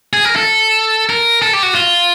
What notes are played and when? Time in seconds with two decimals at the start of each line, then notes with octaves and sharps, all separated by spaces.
0.13 G#4
0.25 A#4
0.36 A4
1.10 A#4
1.42 A4
1.53 G4
1.63 F#4
1.74 F4